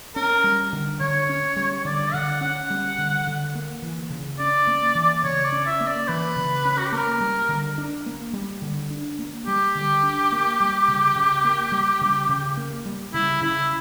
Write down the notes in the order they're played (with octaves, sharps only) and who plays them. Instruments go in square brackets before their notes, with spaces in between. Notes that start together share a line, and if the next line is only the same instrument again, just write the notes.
[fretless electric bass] C#4 [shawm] A#4
[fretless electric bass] G3
D3
[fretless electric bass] D3 [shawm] C#5
[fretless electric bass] C#4
G3
[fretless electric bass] D3 [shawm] D5
[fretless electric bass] D3 [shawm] F#5
[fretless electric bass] C#4 [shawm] F#5
[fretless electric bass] G3
D3
D3
A#3
E3
C#3
[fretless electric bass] C#4 [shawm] D5
[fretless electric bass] A#3
E3
[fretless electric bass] C#3 [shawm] C#5
[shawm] D5
[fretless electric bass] C#4
[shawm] E5
[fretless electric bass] A#3
[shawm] D5
[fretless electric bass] E3 [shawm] B4
[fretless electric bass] C#3
C#4
[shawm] F#4
G4
[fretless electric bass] A#3 [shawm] A#4
[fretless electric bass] G3
D3
D4
A#3
G3
D3
D4
A#3
[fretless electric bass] G3 [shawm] G4
[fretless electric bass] D3
D4
A#3
G3
C#3
C#3
A#3
G3
C#3
C#3
A#3
G3
[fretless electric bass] C#3 [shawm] E4
[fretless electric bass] C#3 [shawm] E4